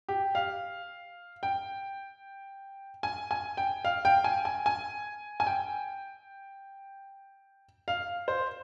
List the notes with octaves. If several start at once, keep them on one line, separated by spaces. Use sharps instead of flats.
G4
F5
G5
G#5
G#5
G5
F5
G5
G#5
G#5
G#5
G#5
G5
F5
C5